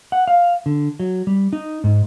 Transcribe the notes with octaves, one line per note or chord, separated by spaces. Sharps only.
F#5
F5
D3
F#3
G3
D#4
G#2